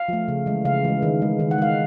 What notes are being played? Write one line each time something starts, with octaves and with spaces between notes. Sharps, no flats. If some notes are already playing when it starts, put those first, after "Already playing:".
Already playing: F5
F3 A3
C#3
E3 G#3
C#3 F5
E3 G#3
D#3
G#3
D#3
F#5
G#3 F5